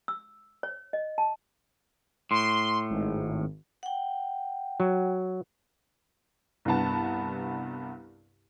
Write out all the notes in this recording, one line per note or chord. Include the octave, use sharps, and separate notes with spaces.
E6
C#5
D#5
A5
A2 C6
G#1
F#5 G5
F#3
C2 G2 B3 A5